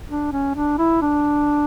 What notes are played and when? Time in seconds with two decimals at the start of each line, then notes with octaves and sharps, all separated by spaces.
0.09 D4
0.32 C#4
0.55 D4
0.78 E4
1.01 D4